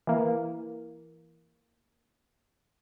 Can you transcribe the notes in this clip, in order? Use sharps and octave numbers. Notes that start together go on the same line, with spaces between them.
E3 A#3